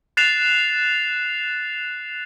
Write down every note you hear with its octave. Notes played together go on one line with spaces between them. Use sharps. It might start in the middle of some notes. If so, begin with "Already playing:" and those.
F#6 A6 C7 E7 F7